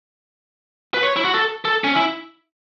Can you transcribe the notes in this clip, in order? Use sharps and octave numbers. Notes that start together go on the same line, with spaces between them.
B4
C#5
E4
F#4
A4
A4
C#4
E4